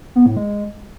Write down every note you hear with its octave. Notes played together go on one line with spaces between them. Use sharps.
B3
A2
G#3